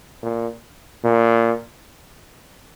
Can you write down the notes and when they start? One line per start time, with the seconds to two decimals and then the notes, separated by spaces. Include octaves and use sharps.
0.23 A#2
1.04 A#2